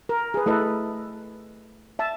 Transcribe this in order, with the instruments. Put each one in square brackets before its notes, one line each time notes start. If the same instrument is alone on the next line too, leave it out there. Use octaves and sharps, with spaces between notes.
[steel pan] A#4
G#4 B4
A3 E4 A4 B4 D#5
E5 A5